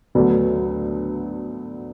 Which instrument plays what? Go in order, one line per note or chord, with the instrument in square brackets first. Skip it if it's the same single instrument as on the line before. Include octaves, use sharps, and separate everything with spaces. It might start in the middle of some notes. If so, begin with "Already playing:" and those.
[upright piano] D2 D3 F#3 B3 D4